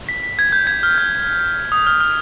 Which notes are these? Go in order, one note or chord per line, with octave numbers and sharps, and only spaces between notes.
B6
B6
G#6
G6
G#6
F6
G6
D#6
F6
F6